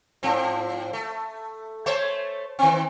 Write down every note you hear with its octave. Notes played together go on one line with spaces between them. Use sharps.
G#2 F3 C4
A3
A3 C5 C#5
D#3 C4